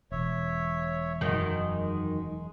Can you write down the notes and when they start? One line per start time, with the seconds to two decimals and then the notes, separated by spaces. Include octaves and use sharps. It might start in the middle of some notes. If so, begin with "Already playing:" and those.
0.12 E1 C#5 E5
1.21 F#2 D#3 G#3